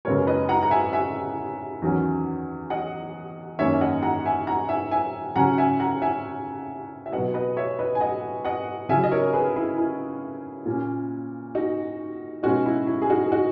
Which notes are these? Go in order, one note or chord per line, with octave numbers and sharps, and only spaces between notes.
F#2 C#3 G#3 B3 A#4 C#5
B4 D#5
F#5 A#5
A#5
E5 G#5
E5 G#5
E2 D#3 F#3 C#4
D#5 F#5
F#2 D#3 A#3 C#4 C#5 E5
E5
D#5 F#5
F#5 A#5
E5 G#5
F#5 A#5
E5 G#5
E5 G#5
C#3 F#3 C#4 F#5 A#5
E5 G#5
F#5 A#5
E5 G#5
E5
B2 F#3 B3 D#5 F#5
B4 D#5
C#5 E5
B4 D#5
G#5
D#5 F#5
D#5 F#5
C#3 F#3 C#4 E5 G#5
D#5
A#4 C#5
G#4 B4
E4 G#4
E4
A#2 A#3 C#4
D#4 F#4
B2 G#3 C#4 D#4 F#4
E4
E4
G#4
D#4 F#4
G#4
D#4 F#4